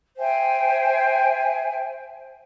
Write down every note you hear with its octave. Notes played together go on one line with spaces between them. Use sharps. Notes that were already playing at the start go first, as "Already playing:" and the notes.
C5 E5 G5 G#5